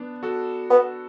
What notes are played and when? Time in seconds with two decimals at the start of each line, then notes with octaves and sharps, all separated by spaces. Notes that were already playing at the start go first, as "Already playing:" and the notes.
Already playing: B3 D4
0.23 F#4 A4
0.70 B3